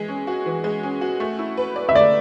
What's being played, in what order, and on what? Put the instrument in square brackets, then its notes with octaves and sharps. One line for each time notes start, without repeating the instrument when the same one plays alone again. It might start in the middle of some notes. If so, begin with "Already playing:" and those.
Already playing: [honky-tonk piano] E3 G#3
C#4
F#4
E3
G#3
C#4
F#4
A3
E4
B4
D5
[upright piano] E5
[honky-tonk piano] A3 [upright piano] D5